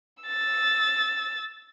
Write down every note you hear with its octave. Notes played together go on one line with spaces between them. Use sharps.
E6 A6